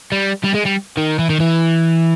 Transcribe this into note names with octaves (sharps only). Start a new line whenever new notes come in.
G3
G3
G#3
G3
D#3
E3
D#3
E3